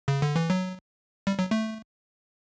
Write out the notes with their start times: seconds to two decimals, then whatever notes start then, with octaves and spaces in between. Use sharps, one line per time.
0.08 C#3
0.22 D3
0.36 E3
0.50 F#3
1.27 G3
1.39 F#3
1.51 A3